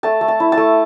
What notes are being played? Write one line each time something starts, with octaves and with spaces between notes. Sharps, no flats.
A3 A5
A3
A5
E4
A5
A3